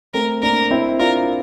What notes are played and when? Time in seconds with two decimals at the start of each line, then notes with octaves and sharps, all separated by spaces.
0.14 A3 C4 A#4
0.42 A#3 D4 A#4
0.71 C4 E4
0.99 D4 F4 A#4